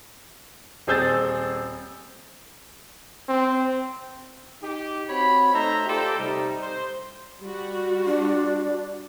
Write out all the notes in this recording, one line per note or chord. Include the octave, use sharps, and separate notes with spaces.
D#1 C4 G#4 E6 G6 A6
C4
D#4 G4
C4 F#4 C#5 B5
A3 D#4 C5 E5 A#5
F4 G4 A4 C5 D5 G5
C3 G3 D#4
C5
G3 F#4
D4